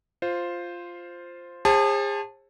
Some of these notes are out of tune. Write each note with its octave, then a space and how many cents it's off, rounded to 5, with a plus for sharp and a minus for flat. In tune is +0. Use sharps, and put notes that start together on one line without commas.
F4 +0 C5 +0
G#4 -35 C5 +40 A5 +0